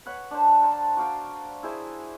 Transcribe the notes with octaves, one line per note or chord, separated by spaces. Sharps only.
B4 C#5 F#5
D4 C5
A#4 C5 A5
F#4 D5 F5 G5
E4 G#4 C5